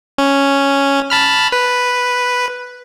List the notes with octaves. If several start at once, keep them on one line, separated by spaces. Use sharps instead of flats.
C#4
A5 B5 F6
B4